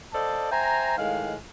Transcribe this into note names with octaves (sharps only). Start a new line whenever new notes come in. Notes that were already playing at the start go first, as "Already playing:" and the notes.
A4 C5 D5 D#5 F5 A5
C5 E5 G5 G#5 A#5
A2 D#3 G#3 F5